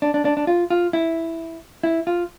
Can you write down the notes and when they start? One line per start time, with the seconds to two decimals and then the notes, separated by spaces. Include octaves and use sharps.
0.02 D4
0.14 D4
0.25 D4
0.37 D4
0.47 F4
0.70 F4
0.93 E4
1.83 E4
2.07 F4